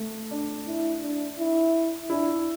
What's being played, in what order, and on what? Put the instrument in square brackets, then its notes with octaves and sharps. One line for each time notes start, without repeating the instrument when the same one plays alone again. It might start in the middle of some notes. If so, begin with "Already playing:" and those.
Already playing: [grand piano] A3
D4
[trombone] E4
D4
E4
[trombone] D4 [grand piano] E4